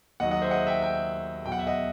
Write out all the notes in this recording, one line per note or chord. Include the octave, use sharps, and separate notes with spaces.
D#2 D#3 F#3 D#5 F#5
D#5 F#5
C5 E5
D#5 F#5
E5 G5
E5 G5
E2 B2 F#3 G5
F#5
E5
D#5 F#5